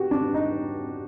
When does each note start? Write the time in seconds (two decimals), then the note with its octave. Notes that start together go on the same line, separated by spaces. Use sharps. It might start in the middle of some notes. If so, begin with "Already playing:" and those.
Already playing: F#4 G4
0.11 D4
0.34 D#4